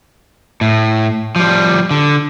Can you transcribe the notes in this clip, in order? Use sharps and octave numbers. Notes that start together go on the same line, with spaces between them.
A2
F3 G3
D3